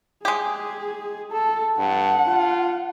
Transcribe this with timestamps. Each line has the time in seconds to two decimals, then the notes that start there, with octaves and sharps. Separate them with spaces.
0.25 G#3 G4 G#4
1.32 A4 A5
1.79 G2 F#5
2.27 F4